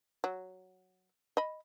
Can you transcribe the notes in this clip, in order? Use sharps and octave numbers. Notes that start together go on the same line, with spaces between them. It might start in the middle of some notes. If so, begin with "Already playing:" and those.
F#3
D#5 B5